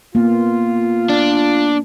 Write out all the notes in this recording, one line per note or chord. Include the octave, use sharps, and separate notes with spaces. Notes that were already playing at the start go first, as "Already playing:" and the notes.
A#3 B3 F4
D4